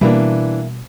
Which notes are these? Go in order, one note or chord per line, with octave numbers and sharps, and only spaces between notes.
B2 E3 G3 A#3 D4 E4